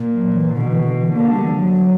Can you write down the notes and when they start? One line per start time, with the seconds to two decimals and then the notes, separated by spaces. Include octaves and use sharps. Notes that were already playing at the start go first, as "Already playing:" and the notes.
Already playing: A#2
0.13 F#3
0.33 E3
0.54 B2 D3
0.69 E3
0.84 D3
0.99 E3
1.13 D3 A#3
1.33 G3
1.44 E3
1.54 F#3